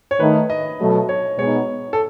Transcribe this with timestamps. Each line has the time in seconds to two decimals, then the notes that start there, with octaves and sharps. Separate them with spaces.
0.11 C#5
0.19 D#3 A3 D#4 B4
0.50 D#5
0.80 B2 F#3 A3
1.09 C#5
1.38 B2 G#3 B3 D#4 C#5
1.93 A4